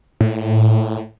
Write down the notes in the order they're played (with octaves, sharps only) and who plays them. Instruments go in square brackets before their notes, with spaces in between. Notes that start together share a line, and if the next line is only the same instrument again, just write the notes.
[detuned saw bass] A2